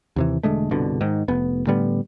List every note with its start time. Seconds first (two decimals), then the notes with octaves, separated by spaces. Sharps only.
0.16 D#2 C3 E3
0.43 E1 D3 G#3 A3
0.71 G1 C2 B2 D3
1.01 G#2 D#3
1.28 F1 B3
1.67 A2 D3 G3 B3